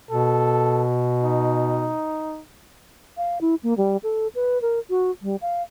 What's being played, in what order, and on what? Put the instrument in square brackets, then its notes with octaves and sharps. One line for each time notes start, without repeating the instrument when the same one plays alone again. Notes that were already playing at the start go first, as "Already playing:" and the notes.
[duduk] B2 [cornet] A4
[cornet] D#4
[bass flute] F5
E4
A#3
G3
A4
B4
A#4
F#4
G3
F5